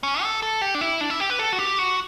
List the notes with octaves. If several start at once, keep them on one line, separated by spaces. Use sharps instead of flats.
C#4
A4
A4
G4
D4
E4
D4
E4
G4
B4
A4
F#4
G4
F#4